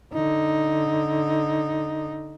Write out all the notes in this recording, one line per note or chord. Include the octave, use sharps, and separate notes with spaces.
D3 D#4